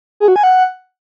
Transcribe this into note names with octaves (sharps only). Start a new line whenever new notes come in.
G#4
F#4
G#5
F#5